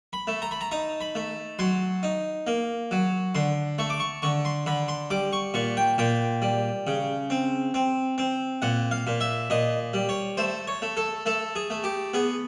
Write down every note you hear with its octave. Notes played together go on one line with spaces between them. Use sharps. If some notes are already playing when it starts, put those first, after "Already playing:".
B5
A3
A#5
B5
A#5
D#4 A#5
B5
A3
F#3 C6
D#4
A#3
F#3
D3 C6
A3 C#6
D6
C#6
D3 C#6
C6
D3 B5
C6
G3 D6
C#6
A#2 C#6
G5
A#2 G5
G3
C#3
C4
C4
C4
A#2 F#5
F5
A#2
E5
A#2 D#5
G3
C#5
A3 C5
C#5
A3
A4
A3 A4
G#4
A3
G4
B3 G#4